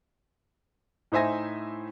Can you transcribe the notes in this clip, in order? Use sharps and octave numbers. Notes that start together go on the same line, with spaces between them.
A2 D#4 C5 E5 G#5 A#6